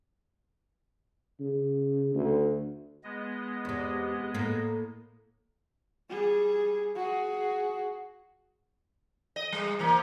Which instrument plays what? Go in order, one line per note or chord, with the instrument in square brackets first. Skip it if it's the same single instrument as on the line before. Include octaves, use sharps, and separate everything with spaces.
[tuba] C#3
D2
[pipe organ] G#3 B3 D#5
[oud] E2 C3
A2 A#3
[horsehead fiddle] G3 G#4
F#4 G#4
[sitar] D#5
G3
C3 E3 A#3